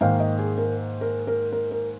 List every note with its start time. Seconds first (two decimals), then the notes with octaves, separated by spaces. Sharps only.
0.01 G#2 D#3 A#3 F5
0.20 D#5
0.39 G#4
0.58 A#4
1.01 A#4
1.27 A#4
1.52 A#4
1.71 A#4